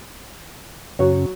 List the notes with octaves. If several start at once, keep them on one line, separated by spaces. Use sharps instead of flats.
F#2 C#3 F#3 C#4 C#5